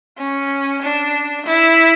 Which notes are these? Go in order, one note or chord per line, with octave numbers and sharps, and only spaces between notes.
C#4
D4
E4